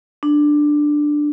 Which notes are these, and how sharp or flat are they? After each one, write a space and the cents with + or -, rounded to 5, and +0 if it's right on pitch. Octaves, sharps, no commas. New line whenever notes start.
D4 +10